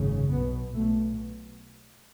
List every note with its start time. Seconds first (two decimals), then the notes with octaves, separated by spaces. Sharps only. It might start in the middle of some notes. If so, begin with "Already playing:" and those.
Already playing: G#1 F#2 C#3
0.30 B1 B2 B3
0.73 B1 B2 A3